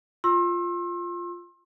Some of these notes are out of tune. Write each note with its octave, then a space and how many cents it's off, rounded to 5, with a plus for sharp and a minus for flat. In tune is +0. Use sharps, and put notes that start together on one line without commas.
F4 +0 C6 +35 E6 +10